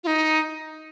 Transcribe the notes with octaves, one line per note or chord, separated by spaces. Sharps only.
F4
D#4